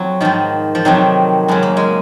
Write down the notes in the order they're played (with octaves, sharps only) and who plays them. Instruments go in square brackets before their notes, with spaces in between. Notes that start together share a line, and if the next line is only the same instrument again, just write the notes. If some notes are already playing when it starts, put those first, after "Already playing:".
Already playing: [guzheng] F2 F#3
G#2 D#3 F3
F3
F2 C3 D#3 F#3
F#2 C#3 G#3
A#3
G#3